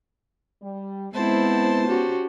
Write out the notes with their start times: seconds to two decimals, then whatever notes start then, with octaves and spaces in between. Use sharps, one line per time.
0.62 G3
1.13 G#3 B3 C4 E4 C5 A5
1.87 C#4 F#4 G4